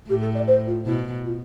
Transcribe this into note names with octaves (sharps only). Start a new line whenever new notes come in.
A2 G4
A4
D5
C5
F4
B2 E4
F4